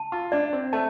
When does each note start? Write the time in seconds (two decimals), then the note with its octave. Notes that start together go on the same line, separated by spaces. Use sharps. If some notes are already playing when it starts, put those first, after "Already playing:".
Already playing: A5
0.12 F4
0.32 D4 D5
0.53 C4
0.73 A3 A5